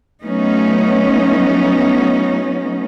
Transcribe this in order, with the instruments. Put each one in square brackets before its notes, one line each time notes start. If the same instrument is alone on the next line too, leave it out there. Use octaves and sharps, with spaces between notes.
[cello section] F#3 A3 B3 C#4 D#4